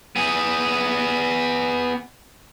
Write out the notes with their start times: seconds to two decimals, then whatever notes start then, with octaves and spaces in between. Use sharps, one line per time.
0.16 B3 G#4